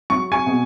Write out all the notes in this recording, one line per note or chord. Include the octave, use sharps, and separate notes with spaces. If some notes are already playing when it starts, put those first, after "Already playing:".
F#3 C#6
G#5 C#6
B2